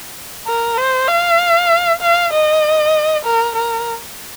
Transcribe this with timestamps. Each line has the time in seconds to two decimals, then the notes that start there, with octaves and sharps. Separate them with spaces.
0.47 A#4
0.78 C5
1.08 F5
2.01 F5
2.33 D#5
3.25 A#4
3.56 A#4